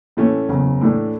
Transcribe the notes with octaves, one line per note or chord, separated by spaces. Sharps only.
A2 E3 A3 C#4
F#1 E2 C#3
A2 E3 A3 D4